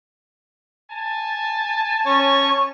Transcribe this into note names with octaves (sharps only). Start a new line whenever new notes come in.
G#5 A5
C#4 C#5 C#6